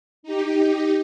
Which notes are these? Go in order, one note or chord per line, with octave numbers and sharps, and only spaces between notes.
D#4 G4